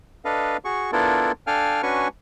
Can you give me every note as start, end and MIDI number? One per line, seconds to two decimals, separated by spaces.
0.25 0.57 62
0.25 0.57 69
0.25 0.57 71
0.25 0.57 75
0.25 0.57 77
0.65 0.91 66
0.65 0.91 68
0.65 0.91 85
0.92 1.32 59
0.92 1.32 62
0.92 1.32 64
0.92 1.32 65
0.92 1.32 69
0.92 1.32 70
1.47 1.82 62
1.47 1.82 69
1.47 1.82 77
1.47 1.82 79
1.47 1.82 80
1.47 1.82 89
1.83 2.08 61
1.83 2.08 62
1.83 2.08 66
1.83 2.08 71
1.83 2.08 80
1.83 2.08 85